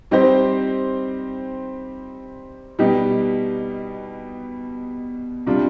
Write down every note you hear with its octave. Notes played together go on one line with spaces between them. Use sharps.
G3 C4 D#4 G4 C5
B2 G3 B3 D#4 G4
C3 G3 D4 F4